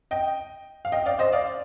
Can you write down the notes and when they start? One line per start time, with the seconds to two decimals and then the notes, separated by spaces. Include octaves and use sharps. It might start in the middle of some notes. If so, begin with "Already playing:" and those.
0.11 D#5 G5
0.85 F5
0.92 D#5 G5
1.06 D5 F5
1.19 C5 D#5
1.32 D5 F5